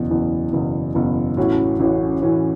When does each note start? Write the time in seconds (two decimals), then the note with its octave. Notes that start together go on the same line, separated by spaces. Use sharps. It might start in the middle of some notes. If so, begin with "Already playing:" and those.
Already playing: F#1 E2 B2
0.10 F#1 E2 B2
0.53 F#1 E2 B2
0.94 F#1 E2 B2
1.37 A1 A2 E3 C#4 F#4
1.79 A1 A2 E3 C#4 F#4
2.22 A1 A2 E3 C#4 F#4